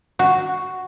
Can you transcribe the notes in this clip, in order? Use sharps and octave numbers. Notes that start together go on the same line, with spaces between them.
F#4